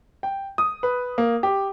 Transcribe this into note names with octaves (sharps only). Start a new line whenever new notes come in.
G5
D#6
B4
A#3
G4